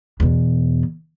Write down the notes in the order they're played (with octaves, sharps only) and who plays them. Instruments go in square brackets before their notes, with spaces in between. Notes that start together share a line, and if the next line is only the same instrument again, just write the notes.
[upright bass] E2 B2